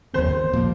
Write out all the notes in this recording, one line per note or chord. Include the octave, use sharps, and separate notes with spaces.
D#2 D#3 C4 C5
A#2 F3 A#3